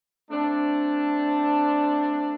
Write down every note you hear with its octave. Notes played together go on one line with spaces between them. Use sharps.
A3 C4 D4